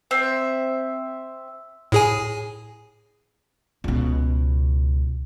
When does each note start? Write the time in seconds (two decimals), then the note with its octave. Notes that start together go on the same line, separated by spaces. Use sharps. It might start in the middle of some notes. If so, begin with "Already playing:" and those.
0.11 C4 E5
1.92 A2 G#4 G#5
3.84 C#2 B2